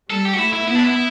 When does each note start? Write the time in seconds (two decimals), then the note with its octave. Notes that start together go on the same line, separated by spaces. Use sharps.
0.10 G3 A4
0.25 G4
0.33 F#4
0.38 A3 E4
0.53 E4
0.67 B3 E4
0.75 D4
0.83 E4